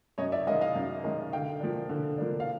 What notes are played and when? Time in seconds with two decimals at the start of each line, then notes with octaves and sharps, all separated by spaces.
0.18 F#2 C#5 D#5
0.32 D5 E5
0.46 D#3 G#3 C#4 D#5 F5
0.61 D#5 F5
0.75 F#2
1.03 D#3 G#3 C#4
1.33 D3 F5 G5
1.61 F3 A#3 D4
1.89 D3
2.18 F3 A#3 D4
2.40 F5